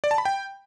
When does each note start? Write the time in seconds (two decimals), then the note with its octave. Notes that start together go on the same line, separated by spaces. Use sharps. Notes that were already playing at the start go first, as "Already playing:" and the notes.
0.04 D5
0.11 A5
0.18 B5
0.25 G5